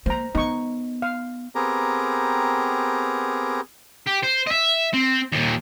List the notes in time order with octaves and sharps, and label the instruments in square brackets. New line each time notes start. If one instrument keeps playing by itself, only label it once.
[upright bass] A#3 [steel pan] C5 A#5
[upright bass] B3 [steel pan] D#4 C#6
[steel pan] F5
[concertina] B3 C4 G4 G#4 A#4 A#5
[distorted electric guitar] G4
C5
D#5 E5
C4
D#2 A#2